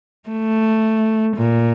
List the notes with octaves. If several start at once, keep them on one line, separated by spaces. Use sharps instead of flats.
A3
A#2